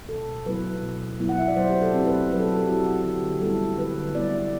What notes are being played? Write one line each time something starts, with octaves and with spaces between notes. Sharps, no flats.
B2 A4
F#3 B3 E4 B4
B2
F#3 B3 E4
F#5
E5
D5
F#3 C5
G4
A4
C4 E4
B4
F#3 B4
A4
G4
A4
C4 E4 F#4
D3 G4
G3 B3 E4 A4
D3 B4
G3 B3 E4 D5